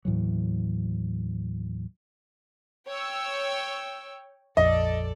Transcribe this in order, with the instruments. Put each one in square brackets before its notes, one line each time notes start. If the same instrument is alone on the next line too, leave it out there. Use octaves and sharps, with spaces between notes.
[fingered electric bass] D#2 A2 E3 F#3
[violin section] C#5 G5 E6
[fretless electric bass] A#1 F2 [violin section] A4 D5 [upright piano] D#5